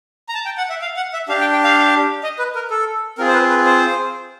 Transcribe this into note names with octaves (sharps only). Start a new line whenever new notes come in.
A#5
A5
G5
F#5
E5
F5
F#5
E5
D4 G4 F5
G5
G5
F5
D#5
B4
A#4
A4
C4 F4 G#4 A#4
C5
B4
B4
C5